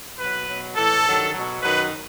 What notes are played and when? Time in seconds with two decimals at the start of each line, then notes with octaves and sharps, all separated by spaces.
0.19 B2 F#3 B4
0.47 B2 F#3
0.76 A2 E3 A4
1.05 G2 D#3 F#3
1.34 B2 F#3
1.62 F#2 D#3 F#3 B4